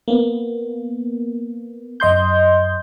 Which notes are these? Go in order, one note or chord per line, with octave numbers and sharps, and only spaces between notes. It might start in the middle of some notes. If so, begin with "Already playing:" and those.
A#3 B3
F#2 D#5 C6 G6